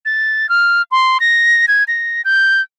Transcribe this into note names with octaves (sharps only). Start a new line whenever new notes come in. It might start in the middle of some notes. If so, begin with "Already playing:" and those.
A6
F6
C6
A#6
G#6
A#6
G6